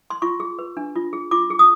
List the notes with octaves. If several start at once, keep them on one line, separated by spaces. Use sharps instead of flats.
C6
F4 C#6
G#4
B4
D4
F4
G#4
F4 D6
G#4
D#6